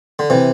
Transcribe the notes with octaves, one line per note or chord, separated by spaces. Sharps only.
D3
C3 E3